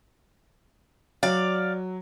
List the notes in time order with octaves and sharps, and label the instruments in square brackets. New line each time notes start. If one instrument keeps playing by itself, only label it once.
[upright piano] F#3 [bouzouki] D5 F5